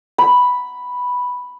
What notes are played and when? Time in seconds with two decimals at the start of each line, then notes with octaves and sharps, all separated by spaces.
0.18 B5